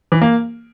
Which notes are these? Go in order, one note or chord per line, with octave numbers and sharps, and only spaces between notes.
E3
A#3